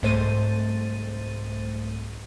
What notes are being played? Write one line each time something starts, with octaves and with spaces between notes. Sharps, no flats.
C2 G#2 A3 C5 A6 D#7